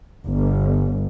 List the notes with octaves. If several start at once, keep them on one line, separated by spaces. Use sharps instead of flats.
G1